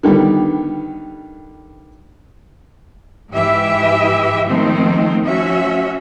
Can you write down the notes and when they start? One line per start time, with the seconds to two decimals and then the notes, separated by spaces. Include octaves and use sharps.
0.03 D3 D#3 G3 B3
3.33 G#2 E3 G4 E5
4.46 D#3 F3 G#3 A3 C4
5.25 F3 C#4 F#4 E5